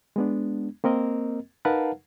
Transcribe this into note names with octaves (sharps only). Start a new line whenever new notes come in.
G#3 B3 D4
A#3 C4 A#4 D#5
D#4 A#4 B4 F5 F#5 A5